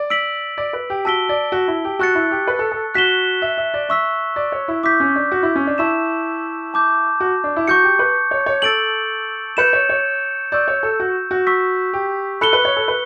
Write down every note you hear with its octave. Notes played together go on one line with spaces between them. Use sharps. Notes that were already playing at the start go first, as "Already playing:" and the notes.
Already playing: D5
E6 B6 D7 F#7
D5
B4
G4
F#4 A5 E6 B6 D7 G7
D5
F#4
E4
G4
F#4 C#6 F#6 A6 C#7
E4
G4
B4
A4
A4
F#4 F#6 B6 E7 G7
E5
E5
D5
E5 C#6 E6 B6
D5
C#5
E4
E4 D6 G6 B6
C#4
D4
F#4
E4
C#4
D4
E4 A5 C#6 E6 B6 E7
A5 D6 G6
F#4
D4
E4
F#4 C#6 G6 C#7
G4
B4
C#5
C#5
A4 E6 A6 D7 F#7
B4 G6 C#7 E7
C#5
C#5
D5 C#6 E6 G6
C#5
A4
F#4
F#4
C#6 E6 B6
G4
A4 B5 F#6 C#7 G7
B4
C#5
A4
B4